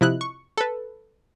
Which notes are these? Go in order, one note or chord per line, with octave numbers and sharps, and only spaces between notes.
C3 F3 E4 D#5 F#6
C#6
A4 B4